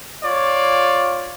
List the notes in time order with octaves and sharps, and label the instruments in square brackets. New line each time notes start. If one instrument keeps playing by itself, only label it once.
[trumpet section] F4 C#5 D5